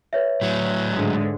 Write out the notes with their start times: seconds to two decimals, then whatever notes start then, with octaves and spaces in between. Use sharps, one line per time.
0.13 B4 C#5 E5
0.42 A2 F#3
0.93 G#2 D3 G#3